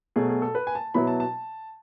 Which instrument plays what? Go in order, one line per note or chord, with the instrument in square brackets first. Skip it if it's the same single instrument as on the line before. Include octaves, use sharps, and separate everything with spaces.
[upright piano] B2 F#3 A3 G#4
G#4
A4
B4
G#5
A5
B2 F#3 B3 E4 B5
A5
A5